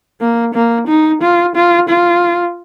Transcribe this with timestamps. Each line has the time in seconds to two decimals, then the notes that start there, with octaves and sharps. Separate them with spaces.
0.21 A#3
0.54 A#3
0.88 D#4
1.22 F4
1.56 F4
1.89 F4